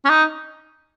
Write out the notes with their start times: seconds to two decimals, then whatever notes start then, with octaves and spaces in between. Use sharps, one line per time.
0.04 C#4
0.10 D#4